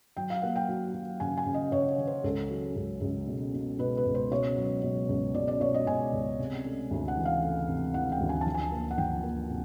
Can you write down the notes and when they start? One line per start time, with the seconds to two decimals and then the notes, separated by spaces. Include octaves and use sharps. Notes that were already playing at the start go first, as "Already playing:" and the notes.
0.17 F#3 G5
0.30 F5
0.42 A#3 F#5
0.56 G5
0.69 F#3
0.94 F#3
1.20 C#3 G#5
1.37 G#5
1.46 C#3
1.54 D#5
1.72 C#3 C#5
1.98 C#3
2.07 C5
2.24 C#2 A4
2.50 F#3
2.76 C#2
3.01 C#2
3.27 B2
3.54 B2
3.79 B2 B4
3.97 B4
4.05 C#2
4.15 C5
4.32 B2 C#5
4.57 F#3
4.82 B2
5.09 C#2
5.34 B2 D5
5.48 D5
5.60 B2 C#5
5.74 D#5
5.86 B2 G#5
6.13 C#2
6.39 C3
6.64 A3
6.91 D2
7.08 F#5
7.17 E3
7.25 F5
7.42 A3
7.68 C3
7.94 E3 F#5
8.12 G5
8.20 D2
8.29 G#5
8.41 F3 A5
8.54 G#5
8.72 A#3
8.91 F#5
8.98 F3 G5
9.23 A#3
9.50 C3